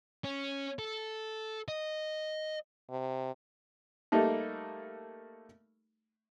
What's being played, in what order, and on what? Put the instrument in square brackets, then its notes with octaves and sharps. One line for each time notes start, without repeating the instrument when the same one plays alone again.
[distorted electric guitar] C#4
A4
D#5
[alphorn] C3
[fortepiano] G3 A3 A#3 D#4 A4